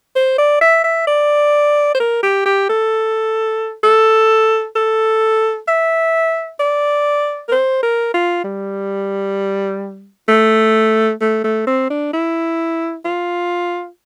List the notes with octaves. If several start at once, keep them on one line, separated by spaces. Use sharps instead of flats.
C5
D5
E5
E5
D5
C5
A#4
G4
G4
A4
A4
A4
E5
D5
A#4
C5
A#4
F4
G3
A3
A3
A3
C4
D4
E4
F4